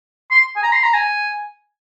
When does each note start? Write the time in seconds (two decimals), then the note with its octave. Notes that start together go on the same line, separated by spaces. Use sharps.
0.31 C6
0.56 G#5
0.63 A#5
0.73 C6
0.84 A#5
0.94 G#5